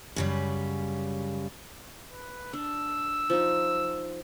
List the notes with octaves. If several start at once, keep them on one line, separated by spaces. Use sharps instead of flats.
F#2 C#3 G3
B4
D4 E6
F3 D#4